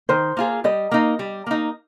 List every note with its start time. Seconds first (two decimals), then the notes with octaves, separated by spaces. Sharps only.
0.09 D#3 C5
0.37 A#3 F4 G#4
0.64 G3 D#5
0.91 A#3 D#4
1.19 G3
1.46 A#3 D#4